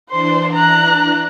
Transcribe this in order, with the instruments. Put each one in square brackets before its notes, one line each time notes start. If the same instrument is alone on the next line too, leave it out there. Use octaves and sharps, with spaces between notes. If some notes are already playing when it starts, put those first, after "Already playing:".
[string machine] E3 D4 [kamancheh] C5 C6
[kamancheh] A#5 F#6